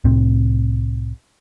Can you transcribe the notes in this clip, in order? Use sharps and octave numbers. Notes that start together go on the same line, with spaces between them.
C2 A2 C4